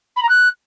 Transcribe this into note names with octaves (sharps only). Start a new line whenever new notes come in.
B5
A#5
F#6